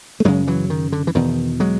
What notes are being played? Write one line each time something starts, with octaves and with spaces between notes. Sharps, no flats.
A3
F#2 C#3 F#3 G#3
E3 F#3
D#3
D3
E3
E2 B2 D#3
F#3 G#3